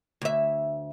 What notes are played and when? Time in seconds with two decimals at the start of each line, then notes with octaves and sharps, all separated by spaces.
0.22 D2 E5